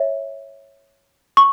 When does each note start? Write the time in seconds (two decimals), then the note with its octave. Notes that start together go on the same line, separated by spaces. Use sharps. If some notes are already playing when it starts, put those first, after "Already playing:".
Already playing: C#5 E5
1.37 C#6